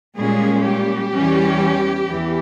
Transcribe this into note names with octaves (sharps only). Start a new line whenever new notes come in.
A#2 G3 G#3 C#4 G#4
G3 G4
E2 E3 G3 C#4
E2 E3